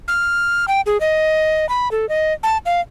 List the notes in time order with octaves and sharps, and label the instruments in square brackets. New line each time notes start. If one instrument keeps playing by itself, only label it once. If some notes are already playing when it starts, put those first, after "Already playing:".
[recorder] F6
G5
G#4
D#5
B5
A4
D#5
A5
F5